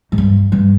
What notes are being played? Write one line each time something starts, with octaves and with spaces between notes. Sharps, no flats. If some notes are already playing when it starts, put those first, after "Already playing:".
G#2
G2
G2